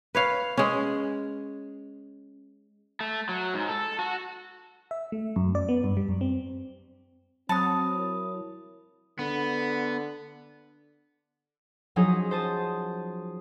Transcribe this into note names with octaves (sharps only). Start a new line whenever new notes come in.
B4 C#5 F5
G#3 C#4
A3
F#3
G#2
A4
F#4
E5
A3
F#2
D5
B3
G2
G3
F#2
C4
F#3 C4 A5 B5 D#6
E4 A#4 C#5
D3 B3
F3 F#3 C#4 D#4 G#4
C5 A5 D#6